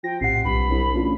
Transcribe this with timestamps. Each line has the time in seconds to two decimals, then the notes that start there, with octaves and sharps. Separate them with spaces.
0.04 F3 G5 A#6
0.21 A#1 A2 C3 F#5 C7
0.45 B1 G2 B5
0.70 C2
0.94 A1 D4 F4